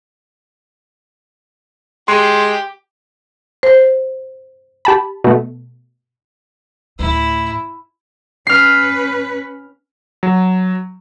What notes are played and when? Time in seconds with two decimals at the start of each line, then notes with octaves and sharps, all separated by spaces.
2.08 G#3 G4 C6
3.63 C5
4.85 G4 A5 B5
5.24 B2 A3
6.99 D2 A2 E4 E6
8.47 C#4 B4 F6 C7
10.23 F#3